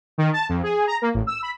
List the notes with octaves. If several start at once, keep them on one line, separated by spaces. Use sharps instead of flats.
D#3
A5
F2
G#4
A#5
A#3
A1
E6
B5